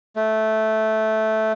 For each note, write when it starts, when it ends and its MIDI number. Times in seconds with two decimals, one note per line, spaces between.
0.16 1.52 57